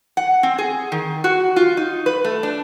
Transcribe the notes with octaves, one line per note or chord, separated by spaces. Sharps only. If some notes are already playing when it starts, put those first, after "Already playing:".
F#5
C4
G#4
D#3
F#4
F4
D#4
B4
A3
D4